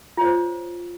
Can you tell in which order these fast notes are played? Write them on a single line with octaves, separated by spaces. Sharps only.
F4 C#5 C5